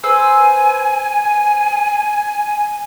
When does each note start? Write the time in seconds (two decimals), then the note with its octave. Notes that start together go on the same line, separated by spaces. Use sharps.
0.04 B4 C5 G#5 E6